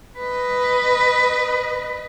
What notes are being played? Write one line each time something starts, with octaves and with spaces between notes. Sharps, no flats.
B4 D#5